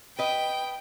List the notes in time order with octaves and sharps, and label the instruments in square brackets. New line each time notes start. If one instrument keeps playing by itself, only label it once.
[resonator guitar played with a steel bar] B4 D#5 [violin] G5